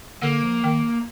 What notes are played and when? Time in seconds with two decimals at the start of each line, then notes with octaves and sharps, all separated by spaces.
0.22 D3 A#3
0.43 F3
0.64 D#3